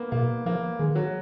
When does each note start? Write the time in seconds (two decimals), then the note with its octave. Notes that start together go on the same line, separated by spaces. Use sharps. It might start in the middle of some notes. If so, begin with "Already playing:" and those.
Already playing: A#3 B3
0.12 B2 A#3
0.46 F3 A#3
0.79 D#3 G#3
0.95 F#3